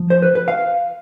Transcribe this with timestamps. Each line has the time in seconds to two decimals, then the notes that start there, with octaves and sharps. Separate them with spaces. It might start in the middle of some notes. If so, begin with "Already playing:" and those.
Already playing: F3
0.10 C5
0.22 B4
0.35 B4
0.48 F5